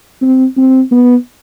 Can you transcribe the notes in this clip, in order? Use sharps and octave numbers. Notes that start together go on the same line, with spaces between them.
C4
C4
B3